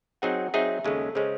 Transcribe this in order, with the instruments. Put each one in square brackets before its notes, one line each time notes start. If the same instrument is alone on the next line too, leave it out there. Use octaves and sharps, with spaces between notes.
[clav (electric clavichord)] F#3 C4 D#4 G#4 [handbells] F#5
[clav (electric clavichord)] F#3 C4 D#4 G#4 [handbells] E5
[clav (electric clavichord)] D#2 C#3 G#3 C#4 [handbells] A4
[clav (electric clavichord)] C#3 G#3 C#4 [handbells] C5